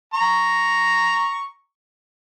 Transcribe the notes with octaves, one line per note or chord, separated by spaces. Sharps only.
A#5 C#6